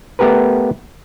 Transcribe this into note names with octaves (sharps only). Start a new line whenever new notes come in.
A3 B3 G4 A#4 B4